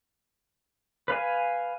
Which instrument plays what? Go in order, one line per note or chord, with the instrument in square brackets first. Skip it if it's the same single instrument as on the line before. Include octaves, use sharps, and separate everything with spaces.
[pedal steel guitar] B4 F5 G#5